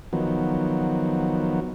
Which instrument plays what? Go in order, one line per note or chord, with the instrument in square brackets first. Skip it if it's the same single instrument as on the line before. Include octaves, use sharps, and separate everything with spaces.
[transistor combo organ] D#3 F3 F#3 B3